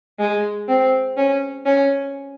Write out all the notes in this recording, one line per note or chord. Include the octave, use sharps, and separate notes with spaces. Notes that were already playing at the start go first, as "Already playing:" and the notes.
G#3
C4
C#4
C#4